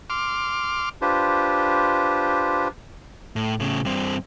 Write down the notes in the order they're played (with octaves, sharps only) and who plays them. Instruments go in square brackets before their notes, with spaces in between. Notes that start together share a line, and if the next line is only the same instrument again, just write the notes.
[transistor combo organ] C6 D6 F6
[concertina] D4 F4 G4 B4 C5
[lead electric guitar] A2
A2 C#3
G2 C4